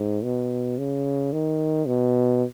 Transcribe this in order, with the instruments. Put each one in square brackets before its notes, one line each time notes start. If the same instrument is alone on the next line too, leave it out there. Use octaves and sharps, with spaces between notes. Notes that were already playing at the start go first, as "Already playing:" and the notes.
Already playing: [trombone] G#2
B2
C#3
D#3
B2